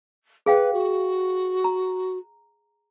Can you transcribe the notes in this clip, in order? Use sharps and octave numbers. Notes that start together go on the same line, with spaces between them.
G#4 B4 F5 G5
F#4
A#5